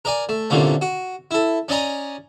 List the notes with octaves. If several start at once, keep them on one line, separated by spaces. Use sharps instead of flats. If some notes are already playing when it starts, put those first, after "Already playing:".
A#4 D5 G#5
A3
C2 A#2 D3 A#3 C#4
F#4
E4 A4
C#4 D5 D#5 G#5 A#5